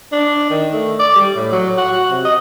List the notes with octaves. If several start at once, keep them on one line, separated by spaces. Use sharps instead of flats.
D4
D#3
A3
D5
G3
A2
F#3
F#4
C3
D#5